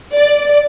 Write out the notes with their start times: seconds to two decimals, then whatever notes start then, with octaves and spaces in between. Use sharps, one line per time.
0.16 D5